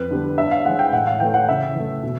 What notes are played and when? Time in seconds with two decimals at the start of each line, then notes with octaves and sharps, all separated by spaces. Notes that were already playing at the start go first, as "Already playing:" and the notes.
Already playing: F2 B4
0.11 D3 G3 B3
0.38 G2 E5
0.51 F5
0.65 E3 G#3 F#5
0.79 G5
0.92 A2 F#5
1.07 F5
1.20 E3 A3 G5
1.34 F#5
1.49 C#3 E5
1.75 E3 A3
2.03 B2